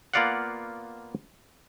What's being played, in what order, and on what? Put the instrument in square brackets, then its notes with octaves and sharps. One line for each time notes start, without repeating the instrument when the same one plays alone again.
[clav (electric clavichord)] A#3 B3 F4 D5 F5 F#5